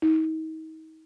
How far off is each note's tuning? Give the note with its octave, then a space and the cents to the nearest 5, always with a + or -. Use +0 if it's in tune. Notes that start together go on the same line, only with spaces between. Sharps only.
D#4 +35